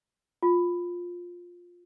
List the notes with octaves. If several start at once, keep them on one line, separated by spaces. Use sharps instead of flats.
F4